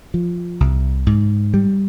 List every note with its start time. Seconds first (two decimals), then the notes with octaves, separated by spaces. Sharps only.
0.14 F3
0.60 C2
1.06 G#2
1.54 G3